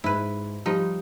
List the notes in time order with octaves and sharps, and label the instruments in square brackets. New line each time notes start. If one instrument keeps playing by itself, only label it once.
[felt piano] G#2 [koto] E4 B4
[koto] F3 D#4 [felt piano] G3